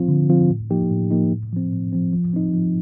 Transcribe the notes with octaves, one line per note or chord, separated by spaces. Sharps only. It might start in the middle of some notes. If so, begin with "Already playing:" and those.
Already playing: F3 C4 F4
D3
F3 C4 F4
A2
F3 A#3 D#4 G4
A2
F3 A#3 D#4 G4
A2
F3 C4
A2
F3 C4
F3
C4 D#4
F3